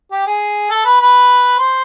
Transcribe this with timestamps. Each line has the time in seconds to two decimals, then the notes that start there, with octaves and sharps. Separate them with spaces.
0.11 G4
0.27 G#4
0.70 A4
0.85 B4
1.00 B4
1.59 C5